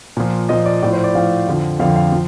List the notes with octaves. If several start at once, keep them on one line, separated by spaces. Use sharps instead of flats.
A#2 F3
A#2 F3 D#5
D5
A2 F3 D5
C5
D5
A2 F3 F5
F2 D3 F3
F2 D3 F3 F5
F5
F3